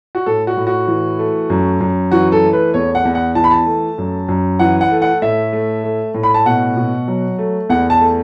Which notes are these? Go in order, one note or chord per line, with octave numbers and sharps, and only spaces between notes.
F#4
A2 A4
F#4
A2
F#4
E3
A3
F#2
F#2
E3 F#4
A4
A3
B4
E2 C#5
F#5
E2
F#5
E3 A5
B5
A5
A3
F#2
F#2
E3 F#5
F#5
A3
F#5
A2 E5
A3
A3
A2
B5
A5
B2 F#5
B2
F#3
A3
E2 F#5
A5
A3